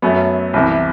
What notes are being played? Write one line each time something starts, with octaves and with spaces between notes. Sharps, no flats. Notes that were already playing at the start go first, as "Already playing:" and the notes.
F#2 F#3 A3 B3
C2 C3 E3